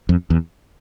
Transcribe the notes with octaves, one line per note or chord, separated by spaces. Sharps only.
F2
E2